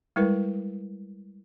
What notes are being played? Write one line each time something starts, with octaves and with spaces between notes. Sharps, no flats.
G3 G#3 E4 A#4 B4